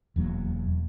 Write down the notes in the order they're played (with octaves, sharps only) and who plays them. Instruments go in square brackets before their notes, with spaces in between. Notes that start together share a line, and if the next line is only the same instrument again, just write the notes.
[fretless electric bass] E1 E2 F#3 A#3